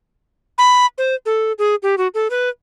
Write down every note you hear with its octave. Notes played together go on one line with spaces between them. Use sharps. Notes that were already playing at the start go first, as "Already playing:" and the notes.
B5
C5
A4
G#4
G4
F#4
A4
B4